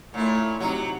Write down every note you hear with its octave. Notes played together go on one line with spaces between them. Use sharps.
A#2 A3 E4 C#5
C3 F#3 D#4